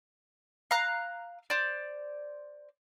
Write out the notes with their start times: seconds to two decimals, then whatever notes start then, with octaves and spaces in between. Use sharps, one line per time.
0.71 F5 A#5 F#6
1.50 C5 D5